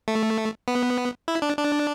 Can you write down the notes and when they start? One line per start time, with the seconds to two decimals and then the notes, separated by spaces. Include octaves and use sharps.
0.08 A3
0.68 B3
1.28 E4
1.42 D4
1.57 D4